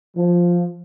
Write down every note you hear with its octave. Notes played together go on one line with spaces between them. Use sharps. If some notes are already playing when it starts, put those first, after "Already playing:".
F3